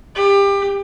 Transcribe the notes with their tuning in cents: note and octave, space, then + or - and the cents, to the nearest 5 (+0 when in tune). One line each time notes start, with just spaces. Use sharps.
G4 +25